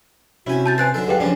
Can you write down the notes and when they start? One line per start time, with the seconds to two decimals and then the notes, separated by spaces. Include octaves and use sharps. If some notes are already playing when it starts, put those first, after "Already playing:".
0.47 C3 C#4 E4 F#4 G#5
0.66 A5 G6 A6
0.78 B4 C5 G#5 F#6 A6
0.94 D3 F#3 D#4 A4
1.08 G#3 G4 G#4 B4 F5 G5
1.20 C#3 F3 C#4 D4 D5